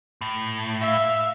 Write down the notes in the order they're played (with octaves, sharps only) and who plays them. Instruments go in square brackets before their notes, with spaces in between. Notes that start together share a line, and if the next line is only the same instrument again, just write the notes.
[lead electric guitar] A2
[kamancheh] E5 F5